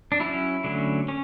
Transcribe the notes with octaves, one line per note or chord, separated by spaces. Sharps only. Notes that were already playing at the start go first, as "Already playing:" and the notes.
D4
F#3 C#4 E4
D3 F#3 A3 C#4
C#4